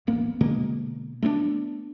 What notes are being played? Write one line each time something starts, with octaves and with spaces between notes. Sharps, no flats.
E1 A1 A#3 B3
B2 D3 G#3 A#3
A3 B3 C4 D4